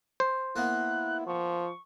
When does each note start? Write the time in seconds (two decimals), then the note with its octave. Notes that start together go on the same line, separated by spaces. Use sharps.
0.20 C5
0.56 A#3 B3 E4 F#6
1.27 F3 C#6